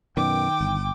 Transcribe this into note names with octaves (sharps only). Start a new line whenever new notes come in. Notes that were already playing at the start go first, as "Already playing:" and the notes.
F#2 B2 D#3 G5 D6
G1